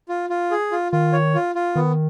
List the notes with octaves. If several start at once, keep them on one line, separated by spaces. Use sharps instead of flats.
F4
F4
G#4
F4
D#3 F4
C#5
F4
F4
D#3 B3